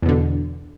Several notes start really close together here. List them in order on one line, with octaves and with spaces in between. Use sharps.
E2 B2 D3